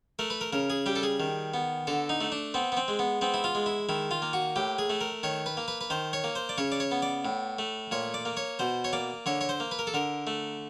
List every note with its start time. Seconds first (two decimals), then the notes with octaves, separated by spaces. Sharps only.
0.19 A3 A#4
0.30 B4
0.41 A#4
0.53 C#3 A#4
0.70 G#4
0.86 G3 G4
0.96 A4
1.03 G#4
1.20 D#3
1.54 B3
1.87 D3 A4
2.09 D#4
2.21 A3
2.32 D4
2.54 B3 C4
2.72 B3
2.77 C4
2.88 G#3
2.99 B3
3.21 B3 C4
3.34 E4
3.44 F4
3.55 G#3
3.66 E4
3.89 D#3 E4
4.11 F4
4.22 A#3
4.33 F#4
4.56 A2 G4
4.79 G#4
4.90 A3
5.01 A#4
5.23 D#3 C#5
5.46 B4
5.57 A#3
5.68 B4
5.81 B4
5.90 D#3 C5
6.13 C#5
6.24 A#3
6.36 C5
6.49 D5
6.58 C#3 C#5
6.72 D5
6.80 C#5
6.91 B3
7.02 D5
7.25 A2
7.59 A3
7.91 A#2 C#5
8.14 D5
8.25 A#3
8.37 C#5
8.59 B2 C5
8.84 C#5
8.93 A#3 D5
9.26 D3 C#5
9.41 C#5
9.49 C5
9.60 A#3
9.71 B4
9.79 A#4
9.87 A4
9.94 D3 A#4
10.27 A3